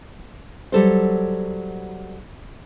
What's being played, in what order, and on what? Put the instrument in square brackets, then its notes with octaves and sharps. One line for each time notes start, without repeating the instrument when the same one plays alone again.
[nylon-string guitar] F#3 G3 A4 C5